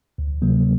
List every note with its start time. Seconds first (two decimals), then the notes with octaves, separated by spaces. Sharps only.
0.18 D2
0.42 C3 F#3 A#3